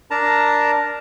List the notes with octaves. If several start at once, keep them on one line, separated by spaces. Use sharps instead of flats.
D4 A#4 A5 A#5